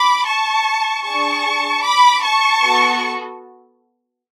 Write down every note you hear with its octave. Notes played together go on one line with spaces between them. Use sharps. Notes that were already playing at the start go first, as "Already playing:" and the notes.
Already playing: B5 D6
A5 C#6
D4 G#4 A5 C#6
B5 D6
A5 C#6
B3 F#4 A4